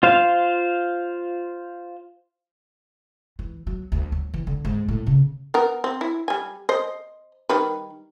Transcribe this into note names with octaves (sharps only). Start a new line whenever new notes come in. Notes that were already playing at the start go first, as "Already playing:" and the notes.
F4 C5 F5
E3
F#3
D2
F#3
E3
D3
G#2
A2
C#3
B3 A#4
C4
E4
G3 G#5
C5 D#5
D#3 G3 B4